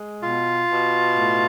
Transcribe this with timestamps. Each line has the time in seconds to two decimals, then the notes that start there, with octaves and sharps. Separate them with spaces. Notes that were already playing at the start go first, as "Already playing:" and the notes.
Already playing: G#3
0.22 B2 F4
0.70 B2
1.17 A2